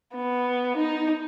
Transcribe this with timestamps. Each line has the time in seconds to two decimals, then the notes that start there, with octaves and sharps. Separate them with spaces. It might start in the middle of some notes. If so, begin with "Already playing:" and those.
0.15 B3
0.77 D#4